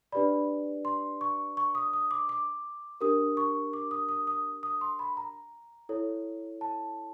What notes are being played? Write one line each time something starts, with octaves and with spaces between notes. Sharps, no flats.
D4 G4 B4 D5 B5
C6
C#6
C#6
D#6
D#6
D6
D6
D4 G4 A#4 D#6
C#6
D6
D#6
D#6
D#6
D#6
C6
B5
A#5
E4 A4 C#5
A5